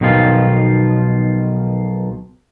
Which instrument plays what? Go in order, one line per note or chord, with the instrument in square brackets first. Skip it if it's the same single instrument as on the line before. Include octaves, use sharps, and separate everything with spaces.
[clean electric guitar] B1 B2 D#3 F3 F4